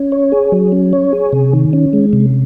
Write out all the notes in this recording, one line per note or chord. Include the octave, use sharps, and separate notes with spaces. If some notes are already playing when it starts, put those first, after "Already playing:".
Already playing: C#4
C#5
G#4
F#3
C#4
C#5
G#4
C3
D#3
C#4
G#3
C3